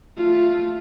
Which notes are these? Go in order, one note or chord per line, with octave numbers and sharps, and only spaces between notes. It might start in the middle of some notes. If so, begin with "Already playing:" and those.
A3 F4